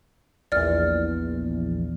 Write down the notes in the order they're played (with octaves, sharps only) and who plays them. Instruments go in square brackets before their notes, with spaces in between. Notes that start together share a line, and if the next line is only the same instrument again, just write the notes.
[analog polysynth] A#1 E2 [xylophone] D5 F6